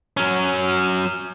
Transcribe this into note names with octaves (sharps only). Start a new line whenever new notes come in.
F#3 C#4